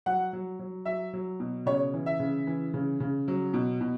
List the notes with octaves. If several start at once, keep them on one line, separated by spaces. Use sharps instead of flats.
F#3 F#5
F#3
F#3
F#3 E5
F#3
B2
C#3 C#5
E3
E5
C#3
E3
C#3
C#3
F#3
B2
B2